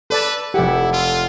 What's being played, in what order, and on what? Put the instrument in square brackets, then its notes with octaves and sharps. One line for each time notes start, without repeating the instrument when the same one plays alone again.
[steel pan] A4 D5 A5 [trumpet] B4
[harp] F1 A4 F#5 [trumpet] E4 [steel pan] G4
[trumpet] F4